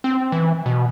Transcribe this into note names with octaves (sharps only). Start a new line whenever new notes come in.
C4
E3
B2